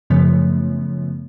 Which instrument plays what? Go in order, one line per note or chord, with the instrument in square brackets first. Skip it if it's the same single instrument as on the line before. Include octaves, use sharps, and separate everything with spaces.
[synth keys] F#2 C#3 F3 A3 B3